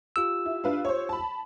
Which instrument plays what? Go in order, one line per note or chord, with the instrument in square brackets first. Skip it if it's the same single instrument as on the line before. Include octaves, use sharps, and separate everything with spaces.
[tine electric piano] F4 G4 E6
[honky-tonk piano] E4
D4 B4 F5
C5 C#5
A5 B5